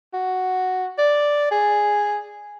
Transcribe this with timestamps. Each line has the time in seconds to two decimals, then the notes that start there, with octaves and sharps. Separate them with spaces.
0.13 F#4
0.98 D5
1.51 G#4